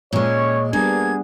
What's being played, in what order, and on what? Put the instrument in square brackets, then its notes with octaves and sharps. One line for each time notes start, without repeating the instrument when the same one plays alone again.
[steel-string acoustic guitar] A#2 G#3 [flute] C#4 [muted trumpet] C#5
[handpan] G3 B3 D4 [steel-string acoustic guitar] A#3 [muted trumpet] G#4 [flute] G#6